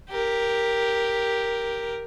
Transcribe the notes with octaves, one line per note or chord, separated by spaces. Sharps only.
G4 A#4